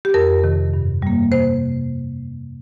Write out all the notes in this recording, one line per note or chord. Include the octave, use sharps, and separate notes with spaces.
G4
F2 A#4
C3 D#3
G2
G3 A#3
C3 C5